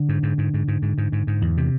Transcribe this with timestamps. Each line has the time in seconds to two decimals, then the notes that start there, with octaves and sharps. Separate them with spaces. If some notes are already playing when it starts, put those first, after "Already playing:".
Already playing: D3
0.09 G#2
0.23 G#2
0.38 G#2
0.54 G#2
0.68 G#2
0.82 G#2
0.98 G#2
1.12 G#2
1.27 G#2
1.42 E2
1.57 C3